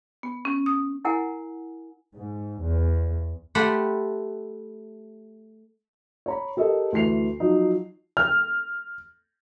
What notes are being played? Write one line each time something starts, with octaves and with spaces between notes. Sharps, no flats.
B3
C#4
D#6
E4 A#4 F#5 G#5
G#2
E2
A3 G4 F#5 B5 C6
C#5 A#5 B5
G4 A4 A#4 D#5
D2 E3 C7 F7
F3 F#3 D#4
F6